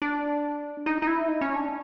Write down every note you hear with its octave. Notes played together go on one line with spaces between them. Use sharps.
D4
D#4
D#4
E4
D#4
C#4
D4